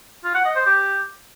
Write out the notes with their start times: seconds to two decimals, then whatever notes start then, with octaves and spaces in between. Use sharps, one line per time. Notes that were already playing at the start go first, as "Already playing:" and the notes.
0.24 F4
0.35 F#5
0.45 D#5
0.56 C5
0.66 G4